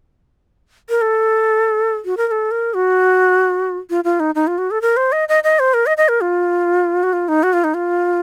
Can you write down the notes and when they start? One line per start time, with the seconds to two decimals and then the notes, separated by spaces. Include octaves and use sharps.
0.89 A#4
1.01 A4
2.05 F#4
2.17 A#4
2.27 A#4
2.31 A4
2.51 A#4
2.74 F#4
3.90 F4
4.04 F4
4.20 D#4
4.35 D#4
4.47 F4
4.58 F#4
4.71 A4
4.82 A#4
4.97 C5
5.12 D#5
5.29 D#5
5.44 D#5
5.59 C5
5.74 A#4
5.86 D#5
5.97 D#5
6.09 A#4
6.21 F4
7.03 F#4
7.13 F4
7.28 D#4
7.43 F#4
7.53 F4
7.64 D#4
7.74 F4